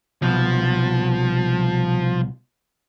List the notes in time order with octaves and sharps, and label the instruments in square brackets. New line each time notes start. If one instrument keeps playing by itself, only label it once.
[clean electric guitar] C2 B2 [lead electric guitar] F3